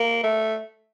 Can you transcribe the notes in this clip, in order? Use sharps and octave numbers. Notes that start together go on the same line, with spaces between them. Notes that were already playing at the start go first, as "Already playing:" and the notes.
Already playing: A#3
A3